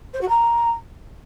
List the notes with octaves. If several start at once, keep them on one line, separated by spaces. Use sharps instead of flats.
C5
F#4
A#5